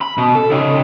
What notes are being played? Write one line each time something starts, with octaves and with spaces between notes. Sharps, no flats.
B5
B2
A4
C#3 D#4